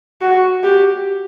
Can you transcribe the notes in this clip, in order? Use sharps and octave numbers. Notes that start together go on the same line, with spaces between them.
F#4
G4